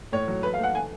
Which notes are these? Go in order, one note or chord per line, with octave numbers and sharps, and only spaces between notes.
A2 C#5
F#3
A3 B4
F5
A3 F#5
A3 G#5